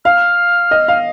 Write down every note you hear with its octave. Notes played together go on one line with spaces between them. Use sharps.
F5 F6
D#5
F5